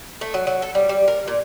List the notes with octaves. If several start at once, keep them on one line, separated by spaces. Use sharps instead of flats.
A3
F#3
F#3
A4
G3
G3
A#4
A#2